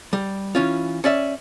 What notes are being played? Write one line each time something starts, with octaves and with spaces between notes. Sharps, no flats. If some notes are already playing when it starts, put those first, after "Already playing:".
G3
E3 C#4 F4
C#4 D5 E5